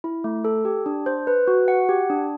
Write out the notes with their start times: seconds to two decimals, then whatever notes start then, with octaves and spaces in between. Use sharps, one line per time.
0.04 E4
0.24 A3
0.45 A4
0.65 G4
0.86 D4
1.06 C5
1.27 B4
1.48 F#4
1.68 F#5
1.89 G4
2.10 D4